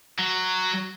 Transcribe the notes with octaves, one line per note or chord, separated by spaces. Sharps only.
F#3